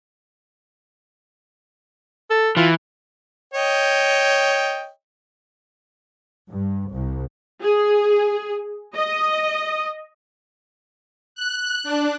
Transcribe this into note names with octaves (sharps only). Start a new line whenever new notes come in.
A4
E3 F4
C#5 D#5 G5
G2
C2
G#4
D#5
F#6
D4